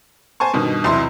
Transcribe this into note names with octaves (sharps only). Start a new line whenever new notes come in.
C5 G#5 A5 C#6
G2 B2 D#3
B1 E2 C3 E4 C6